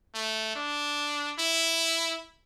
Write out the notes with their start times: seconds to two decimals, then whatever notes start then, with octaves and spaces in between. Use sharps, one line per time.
0.15 A3
0.56 D4
1.39 E4